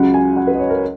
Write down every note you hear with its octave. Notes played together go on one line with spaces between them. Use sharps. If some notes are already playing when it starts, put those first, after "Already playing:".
Already playing: C#2 C#3 F#3 F#5
G#5
F#5
B4
D#5
C#5
A#4